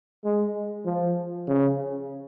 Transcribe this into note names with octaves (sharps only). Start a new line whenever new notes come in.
G#3
F3
C#3